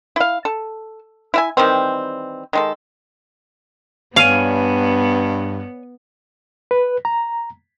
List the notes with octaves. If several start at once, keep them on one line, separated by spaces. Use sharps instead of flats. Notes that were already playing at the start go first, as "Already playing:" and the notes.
E4 F5
A4
E4 E5 G#5
D#3 E3 G3 C4
D#3 G#3 A4
G2 B3 C#5 D5 F5 G#5
B4
A#5